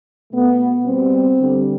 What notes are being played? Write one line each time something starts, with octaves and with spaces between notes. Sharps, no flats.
B2 A3 B3
B2 G3 C4
D3 G3